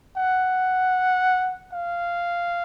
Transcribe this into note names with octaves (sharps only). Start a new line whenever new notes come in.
F#5
F5